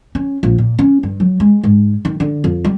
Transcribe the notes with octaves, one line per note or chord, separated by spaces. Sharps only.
C#4
A#1
A#2
C#4
G2
F#3
G#3
G#2
D#3
D3
F2
G3